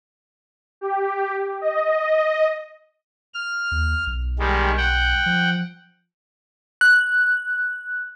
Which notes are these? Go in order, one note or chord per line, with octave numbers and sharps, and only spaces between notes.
G4
D#5
F6
D#2
B1
D#3 G3 G#3
F#5 G5
F3
F#6